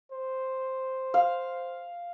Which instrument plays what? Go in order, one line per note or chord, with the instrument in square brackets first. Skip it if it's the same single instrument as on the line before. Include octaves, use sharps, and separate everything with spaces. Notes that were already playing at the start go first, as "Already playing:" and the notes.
[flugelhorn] C5
[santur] F5